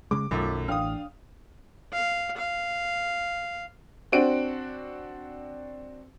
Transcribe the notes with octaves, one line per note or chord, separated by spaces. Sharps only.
C#3 G#3 D6
B1 F#2 D#3 F3 A3
A1 D4 F5 G5 D#6 F6
F5
F5
C4 D4 F#4 D7